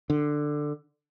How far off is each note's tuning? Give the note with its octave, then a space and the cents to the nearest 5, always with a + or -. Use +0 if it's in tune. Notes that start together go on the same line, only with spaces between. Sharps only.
D3 +10